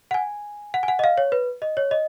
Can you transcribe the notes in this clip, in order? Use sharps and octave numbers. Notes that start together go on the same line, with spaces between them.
F#5
G#5
F#5
G#5
F#5
D#5
F5
C#5
B4
D#5
C#5
D#5